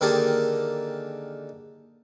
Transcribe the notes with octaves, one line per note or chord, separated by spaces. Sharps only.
D3 D#3 A#3 G4 G#4 A5